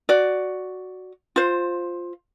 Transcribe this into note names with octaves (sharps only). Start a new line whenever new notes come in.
F#4 D5
F4 C5